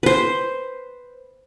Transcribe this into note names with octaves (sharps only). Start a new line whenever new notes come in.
B4 C5